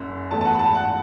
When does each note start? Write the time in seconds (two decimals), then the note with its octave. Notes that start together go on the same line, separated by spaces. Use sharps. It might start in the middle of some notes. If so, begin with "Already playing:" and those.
Already playing: F#1 F#2
0.30 E2 E3 A3 A5
0.41 A5
0.45 F#5
0.54 B5
0.59 A5
0.75 F#5